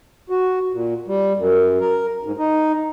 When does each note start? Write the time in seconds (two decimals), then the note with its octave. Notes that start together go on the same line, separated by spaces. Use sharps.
0.30 F#4
0.72 A#2
1.07 G3
1.37 F#2
1.80 A#4
2.23 G#2
2.38 D#4